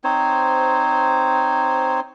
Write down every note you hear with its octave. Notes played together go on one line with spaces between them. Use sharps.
C4 D#4 C5 C#5